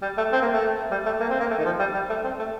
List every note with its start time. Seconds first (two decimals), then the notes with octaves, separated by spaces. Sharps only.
0.02 G3
0.18 A3
0.33 C4
0.42 A#3
0.52 A3
0.92 G3
1.06 A3
1.20 A#3
1.30 C4
1.40 A#3
1.51 A3
1.59 D#3
1.66 F3
1.79 G3
1.94 G3
2.10 A3
2.25 C4
2.39 A3